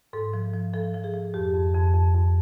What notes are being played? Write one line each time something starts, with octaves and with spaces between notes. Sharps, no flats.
G#2 A4
F3
F3
F3 A4
F3
G#4
F3
F2 G4
F2
F2
F2
F2